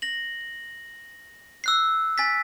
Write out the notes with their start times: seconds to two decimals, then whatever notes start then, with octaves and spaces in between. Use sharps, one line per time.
0.02 A#6 F#7
1.64 E6 F#6 C7
2.18 G#5 A6 B6